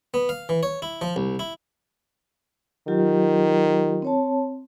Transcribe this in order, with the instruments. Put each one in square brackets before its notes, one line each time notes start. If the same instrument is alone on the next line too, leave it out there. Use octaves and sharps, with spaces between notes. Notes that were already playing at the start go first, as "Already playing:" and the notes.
[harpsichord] B3
F5
E3
C#5
E4
F3
C2
E4
[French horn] D#3 [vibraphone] F#3 F4 G4
[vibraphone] C4 C#5 A5